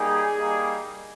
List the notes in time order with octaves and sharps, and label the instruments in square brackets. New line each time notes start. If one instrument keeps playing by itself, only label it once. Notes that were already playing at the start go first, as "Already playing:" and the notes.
Already playing: [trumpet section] G3 A#3 D#4 G4 G#4
G3 A#3 D#4